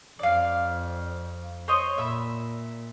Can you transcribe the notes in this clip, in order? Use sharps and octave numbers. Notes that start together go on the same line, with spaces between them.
F2 D5 F5
C5 C#5 D#5
A#2 E5 B5